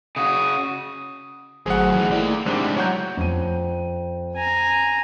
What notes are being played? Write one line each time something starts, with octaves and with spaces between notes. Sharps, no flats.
C#3 F#4 D#6
G#1 F#3 A3 G#4 C5 F#5
A2 E3 D#4
A3 A#3 E4 D5 G5
G#2 C3 G#3 D4 G4
F#3 C#5 F#5 G6
F2 D#7
G#5 A#5